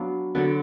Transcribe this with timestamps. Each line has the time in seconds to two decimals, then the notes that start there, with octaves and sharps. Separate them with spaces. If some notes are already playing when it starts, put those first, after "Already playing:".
Already playing: F#3 B3 D4 F5
0.35 D3 F#3 B3 D4